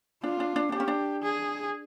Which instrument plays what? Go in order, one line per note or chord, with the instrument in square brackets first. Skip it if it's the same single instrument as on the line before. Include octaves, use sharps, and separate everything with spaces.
[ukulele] D4 [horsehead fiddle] F4
[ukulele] D4
D4
[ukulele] D4 [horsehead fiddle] G4
[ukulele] C#4
D4
[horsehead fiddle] G#4